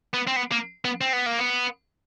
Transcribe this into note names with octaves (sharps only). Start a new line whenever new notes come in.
B3
C4
B3
A#3
B3
C4
B3
A#3
B3